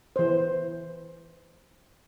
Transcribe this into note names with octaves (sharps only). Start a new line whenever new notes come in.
E3 C5